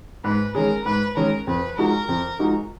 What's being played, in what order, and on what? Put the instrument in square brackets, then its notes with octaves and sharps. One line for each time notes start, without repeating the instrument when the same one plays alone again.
[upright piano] G#2 [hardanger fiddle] B4
[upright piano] D#3 G#3 C#4 G#4 [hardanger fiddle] A#4
[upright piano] G#2 [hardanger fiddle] B4
[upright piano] D#3 G#3 C#4 G#4 [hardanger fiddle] A#4
[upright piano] F2 [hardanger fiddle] B4
[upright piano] F3 G#3 D#4 F#4 [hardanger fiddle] A#4
[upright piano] F2
F3 G#3 D#4 F#4